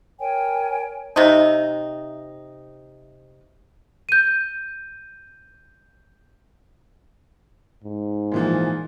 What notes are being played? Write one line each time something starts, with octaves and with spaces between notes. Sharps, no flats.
A#4 C#5 G5 G#5
C3 D#4
G6 D#7
G#2
A#2 E3 F3